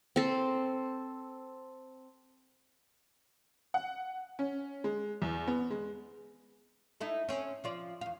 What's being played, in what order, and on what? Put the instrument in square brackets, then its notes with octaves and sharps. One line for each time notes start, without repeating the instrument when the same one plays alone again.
[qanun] C4 A4
[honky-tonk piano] F#5
C#4
G#3
E2
B3
G#3
[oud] D#4 E4 A4
C4 C#4
F3 F4 D5
E2 F5